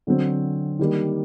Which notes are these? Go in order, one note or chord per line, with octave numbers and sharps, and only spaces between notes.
D3 F#3 C4
D#3 G3 A#3